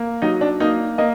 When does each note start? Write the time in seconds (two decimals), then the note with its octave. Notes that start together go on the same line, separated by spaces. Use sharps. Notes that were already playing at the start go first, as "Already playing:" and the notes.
Already playing: A#3
0.22 F#3 D#4
0.41 D4
0.60 A#3 D#4
0.98 A#3 D#5